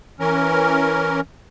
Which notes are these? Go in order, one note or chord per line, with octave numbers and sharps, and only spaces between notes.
E3 C#4 A#4